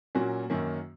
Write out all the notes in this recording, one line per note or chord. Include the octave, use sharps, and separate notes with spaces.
A#2 F#3 A#3 C#4 F#4
F#2 D#3 A#3 C#4